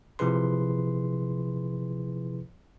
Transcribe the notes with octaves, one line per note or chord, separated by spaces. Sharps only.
C3 F3 E4 G#4 B4 C6